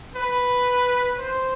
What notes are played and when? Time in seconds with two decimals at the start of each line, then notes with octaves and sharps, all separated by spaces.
0.16 B4
1.19 C5